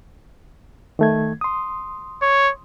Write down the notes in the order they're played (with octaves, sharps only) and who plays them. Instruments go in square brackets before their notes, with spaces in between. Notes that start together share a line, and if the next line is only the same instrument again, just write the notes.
[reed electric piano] D#3 A3 G#6
C6 D#6
[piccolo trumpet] C#5